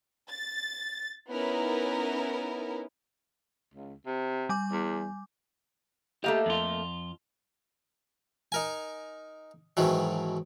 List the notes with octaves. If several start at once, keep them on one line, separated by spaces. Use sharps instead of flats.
A6
B3 C#4 D#4 E4 A#4
C#2
C3
G3 G#5 D6
E2
A3 A#3 G4 D#5 F5
F2 F4
D#4 A#4 G#5
G#2 B2 D#3 E3 F#3